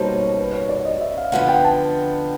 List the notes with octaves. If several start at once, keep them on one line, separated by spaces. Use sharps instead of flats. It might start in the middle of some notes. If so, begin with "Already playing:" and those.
Already playing: B2 G3 A#3 D#4 C5 C#5 A5
C#5
B4
C#5
D5
D#5
E5
F5
D3 F3 G#3 B3 F#5
F#5
G5
A5